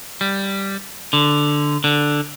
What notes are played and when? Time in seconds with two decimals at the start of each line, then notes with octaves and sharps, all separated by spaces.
0.21 G3
1.13 D3
1.84 D3